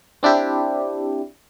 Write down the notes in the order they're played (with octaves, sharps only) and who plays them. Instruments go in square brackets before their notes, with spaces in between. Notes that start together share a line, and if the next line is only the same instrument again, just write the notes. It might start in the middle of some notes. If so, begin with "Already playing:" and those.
[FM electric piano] C4 D4 E4 G4